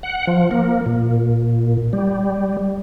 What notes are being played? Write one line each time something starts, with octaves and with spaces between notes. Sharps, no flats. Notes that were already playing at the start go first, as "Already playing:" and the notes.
F#5
F3
A#3
A#2
G3